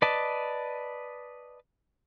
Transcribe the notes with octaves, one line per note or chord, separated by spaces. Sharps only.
B4 D5 D#5 A5